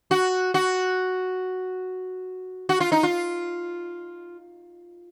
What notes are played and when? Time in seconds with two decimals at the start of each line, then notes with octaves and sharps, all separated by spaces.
0.11 F#4
0.54 F#4
2.69 F#4
2.80 F4
2.92 D#4
3.03 F4